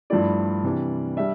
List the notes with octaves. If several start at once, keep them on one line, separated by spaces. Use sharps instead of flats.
G2 F3 A3 E4 D5
C3 E3 G3 D4
G3 D4 E5